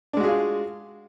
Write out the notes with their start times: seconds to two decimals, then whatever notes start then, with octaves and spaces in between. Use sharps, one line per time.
0.13 D4
0.17 G#3
0.20 F#4
0.24 G#4
0.27 F4